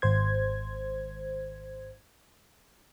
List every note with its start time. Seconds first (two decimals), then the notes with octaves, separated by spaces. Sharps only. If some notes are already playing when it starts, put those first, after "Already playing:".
0.02 G#1 C5 G#6